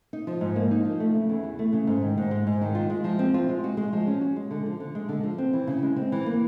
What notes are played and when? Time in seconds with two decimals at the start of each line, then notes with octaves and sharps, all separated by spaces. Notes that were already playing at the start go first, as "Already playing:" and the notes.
0.13 D#4
0.27 F3
0.41 G#2
0.56 A#3
0.71 D#4
0.85 F3
1.00 A3
1.15 C#3
1.29 E2
1.44 E3
1.59 A3
1.73 C#3
1.87 G#2
2.03 D#3
2.18 G#2
2.31 G#3
2.47 G#2
2.61 D#3
2.75 F4
2.90 G#3
3.04 F3
3.19 C4
3.34 F4
3.49 G#3
3.64 F#4
3.77 G#3
3.93 F3
4.07 C#4
4.21 F#4
4.36 G#3
4.51 D3
4.66 F3
4.80 D3
4.95 G#3
5.09 D3
5.23 F3
5.38 C4
5.53 E3
5.67 C#3
5.82 G#3
5.96 C4
6.12 E3
6.26 A#3